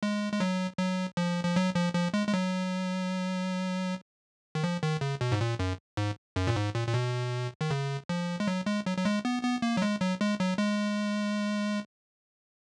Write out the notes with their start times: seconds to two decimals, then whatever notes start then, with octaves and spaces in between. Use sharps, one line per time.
0.03 G#3
0.33 G#3
0.40 F#3
0.79 F#3
1.17 F3
1.44 F3
1.56 F#3
1.75 F3
1.94 F3
2.14 G#3
2.27 G#3
2.34 F#3
4.55 D#3
4.63 F3
4.83 D#3
5.01 C#3
5.21 B2
5.32 G#2
5.41 A#2
5.59 F#2
5.97 G#2
6.36 F#2
6.47 A#2
6.56 G#2
6.75 A#2
6.88 A#2
6.94 B2
7.61 D#3
7.70 C#3
8.09 F3
8.40 G#3
8.47 F#3
8.66 G#3
8.86 F#3
8.97 F#3
9.05 G#3
9.25 B3
9.43 B3
9.62 A#3
9.77 F#3
9.82 G#3
10.01 F#3
10.21 G#3
10.40 F#3
10.58 G#3